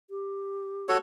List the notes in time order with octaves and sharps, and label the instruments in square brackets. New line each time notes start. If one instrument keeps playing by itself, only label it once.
[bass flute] G4
[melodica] F#4 A4 C#5